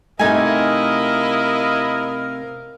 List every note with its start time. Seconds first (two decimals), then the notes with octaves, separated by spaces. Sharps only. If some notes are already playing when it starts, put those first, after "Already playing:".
0.19 C3 A3 D#4 E4 A#4 D#5 F5 G#5